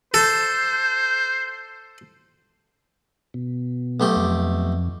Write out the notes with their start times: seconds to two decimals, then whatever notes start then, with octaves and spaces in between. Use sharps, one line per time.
0.14 A4 C5
3.34 B2
4.00 B1 A3 G4
4.16 F2